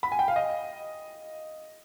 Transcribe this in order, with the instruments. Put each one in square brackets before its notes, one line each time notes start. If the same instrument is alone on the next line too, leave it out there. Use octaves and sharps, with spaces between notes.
[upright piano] B5
G#5
G5
F5
D#5